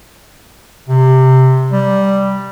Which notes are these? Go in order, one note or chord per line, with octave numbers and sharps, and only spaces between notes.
C3
G3